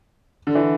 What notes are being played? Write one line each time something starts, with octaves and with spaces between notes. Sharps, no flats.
D3
E3